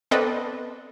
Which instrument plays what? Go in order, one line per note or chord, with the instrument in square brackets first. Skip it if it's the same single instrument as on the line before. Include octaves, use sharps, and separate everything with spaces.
[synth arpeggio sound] B3 C4 A4 B4 D5 D#5